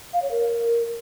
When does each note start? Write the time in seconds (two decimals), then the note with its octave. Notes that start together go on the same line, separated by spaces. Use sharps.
0.13 F5
0.22 C#5
0.31 A#4